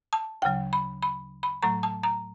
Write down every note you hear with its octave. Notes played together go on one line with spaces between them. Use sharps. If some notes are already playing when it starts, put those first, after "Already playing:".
A5
D2 C#3 F#3 G5
B5
B5
B5
A2 F#3 A3 A#5
A5
A#5